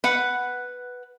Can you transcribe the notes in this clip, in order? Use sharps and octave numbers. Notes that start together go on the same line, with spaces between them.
B4 F#5